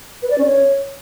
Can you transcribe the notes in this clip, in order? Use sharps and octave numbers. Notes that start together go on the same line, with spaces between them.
B4
D5
C#4
C#5